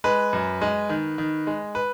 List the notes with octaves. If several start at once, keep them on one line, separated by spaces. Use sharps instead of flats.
G#3 B4
F#2
G#3
D#3
D#3
G#3
B4